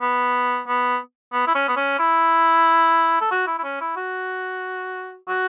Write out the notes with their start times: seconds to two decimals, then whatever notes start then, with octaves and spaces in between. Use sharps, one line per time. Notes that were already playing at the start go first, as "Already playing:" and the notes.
0.01 B3
0.68 B3
1.33 B3
1.47 E4
1.55 C#4
1.68 B3
1.77 C#4
1.99 E4
3.21 A4
3.31 F#4
3.47 E4
3.58 E4
3.64 C#4
3.81 E4
3.96 F#4
5.29 F#4